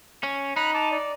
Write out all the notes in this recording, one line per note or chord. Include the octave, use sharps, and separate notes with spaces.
C#4
D#4 B5 F#6
A5 D6
D5